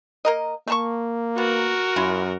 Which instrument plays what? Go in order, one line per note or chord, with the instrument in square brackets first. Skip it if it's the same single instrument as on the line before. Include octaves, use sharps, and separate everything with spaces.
[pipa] A#3 A#4 D#5
[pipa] A3 A5 C#6 [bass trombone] A#3
[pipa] B3 [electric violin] F#4 A#4
[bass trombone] F#2 [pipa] C#4 E4 F4